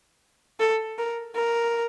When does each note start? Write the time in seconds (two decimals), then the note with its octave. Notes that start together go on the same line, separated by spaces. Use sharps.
0.60 A4
0.98 A#4
1.35 A#4